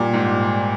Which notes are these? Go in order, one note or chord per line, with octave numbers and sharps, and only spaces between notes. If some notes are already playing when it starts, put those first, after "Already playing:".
Already playing: A#2 G3 G4 D5 G5 A#5 D6
G#2